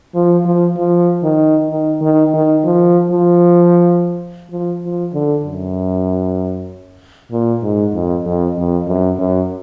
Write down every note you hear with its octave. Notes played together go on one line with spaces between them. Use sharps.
F3
F3
F3
D#3
D#3
D#3
D#3
F3
F3
F3
F3
D3
F#2
A#2
G#2
F2
F2
F2
F#2
F#2